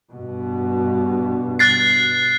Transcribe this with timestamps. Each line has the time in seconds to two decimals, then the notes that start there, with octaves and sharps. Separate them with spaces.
0.12 G2 B2
1.59 F#6 A6 C7